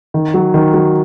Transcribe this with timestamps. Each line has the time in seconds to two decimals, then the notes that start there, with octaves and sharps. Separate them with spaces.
0.14 D#3
0.34 F#3
0.54 D#3
0.74 F#3